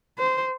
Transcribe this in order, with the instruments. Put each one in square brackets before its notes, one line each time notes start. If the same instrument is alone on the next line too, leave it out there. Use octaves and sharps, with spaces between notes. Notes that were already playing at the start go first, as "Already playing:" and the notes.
[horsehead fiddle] C5